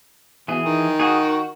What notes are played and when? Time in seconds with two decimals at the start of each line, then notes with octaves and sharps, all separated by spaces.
0.48 B2 E3 G#4
0.65 D#3
1.00 F#4 G#4
1.21 F#4